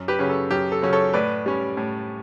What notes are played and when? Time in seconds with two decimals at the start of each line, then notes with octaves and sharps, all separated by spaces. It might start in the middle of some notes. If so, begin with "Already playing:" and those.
Already playing: F#2
0.08 G4 B4
0.19 C#3 F#3 C#4
0.29 A4
0.51 F#2 G4
0.72 A4
0.82 C#3 F#3 C#4
0.93 A4 C#5
1.13 A2 B4 D5
1.46 G3 C#4
1.77 A2